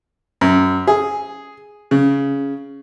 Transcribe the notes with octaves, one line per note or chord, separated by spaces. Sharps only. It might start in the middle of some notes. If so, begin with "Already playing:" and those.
F#2
G#4
C#3